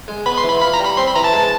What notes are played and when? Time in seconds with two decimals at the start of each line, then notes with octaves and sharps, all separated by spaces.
0.08 G#3
0.26 B3 B5
0.38 C6
0.44 E3
0.50 B5
0.61 F4 B5
0.74 A#5
0.79 G3
0.85 B5
0.97 C4 C6
1.06 B5
1.16 E3 A#5
1.24 A5
1.33 G#3